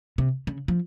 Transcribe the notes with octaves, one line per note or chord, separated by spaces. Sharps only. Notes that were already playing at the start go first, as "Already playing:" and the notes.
C3
C#3
F3